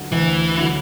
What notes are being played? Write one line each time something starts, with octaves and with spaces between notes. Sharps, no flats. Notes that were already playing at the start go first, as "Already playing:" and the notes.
Already playing: D3 F#3
D2 E3
D3 F#3